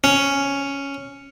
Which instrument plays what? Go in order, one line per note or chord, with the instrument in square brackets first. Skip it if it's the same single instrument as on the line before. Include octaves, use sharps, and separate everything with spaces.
[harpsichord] C#4